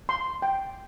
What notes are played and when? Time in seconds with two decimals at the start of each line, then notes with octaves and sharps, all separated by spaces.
0.09 C6
0.42 G5